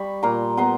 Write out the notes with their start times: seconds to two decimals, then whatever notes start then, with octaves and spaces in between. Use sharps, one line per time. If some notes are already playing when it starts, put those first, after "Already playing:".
Already playing: G3 B5 C#6
0.23 A#2 A#5 C6
0.57 B3 A#5 C6